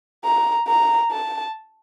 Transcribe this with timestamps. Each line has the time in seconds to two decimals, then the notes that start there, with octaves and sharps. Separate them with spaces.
0.24 A#5
0.68 A#5
1.11 A5